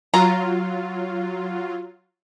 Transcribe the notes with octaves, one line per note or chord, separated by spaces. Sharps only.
F#3 F4 A#5